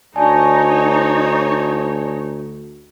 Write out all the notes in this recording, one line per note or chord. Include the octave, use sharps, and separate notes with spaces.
D2 D#4 C#5 D5 G#5 A5